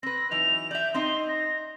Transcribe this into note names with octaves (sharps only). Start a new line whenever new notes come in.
C4 B4 A#6
E3 F#3 D#4 F7
D5 E5 G6
C4 D#4 D#5 C6
A#6